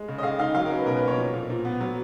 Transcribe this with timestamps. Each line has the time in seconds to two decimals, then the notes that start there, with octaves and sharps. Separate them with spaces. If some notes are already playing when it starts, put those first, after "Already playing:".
Already playing: G#3
0.08 C#3
0.18 D#5
0.23 C#3 F5
0.39 D#4 F5
0.55 F#3 F5
0.65 A#4
0.71 C#4
0.76 B4
0.86 B2 A#4
0.97 B4
1.02 A#3
1.08 C#5
1.18 F3
1.34 A#2
1.50 A#2
1.65 B3
1.81 F#3